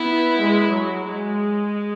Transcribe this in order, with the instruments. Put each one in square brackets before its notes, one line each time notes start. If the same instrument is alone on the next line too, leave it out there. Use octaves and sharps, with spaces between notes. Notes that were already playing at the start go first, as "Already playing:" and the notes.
Already playing: [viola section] B3 [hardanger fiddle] E4
[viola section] G#3
F#3
G#3